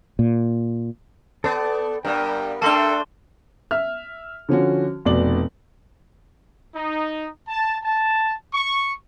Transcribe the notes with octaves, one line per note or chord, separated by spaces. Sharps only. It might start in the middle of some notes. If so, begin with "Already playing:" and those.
A#2
B3 A4 D5 A5
G2 G3 B3 A#4 G5
A3 D4 A4 G5 A5 C6 G7
E5 F6
D3 F3 C#4 F#4
F1 B2 D5 F#7
D#4
A5
A5
C#6